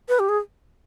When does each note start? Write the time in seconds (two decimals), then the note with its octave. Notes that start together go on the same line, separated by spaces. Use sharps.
0.09 B4
0.19 G4
0.29 G#4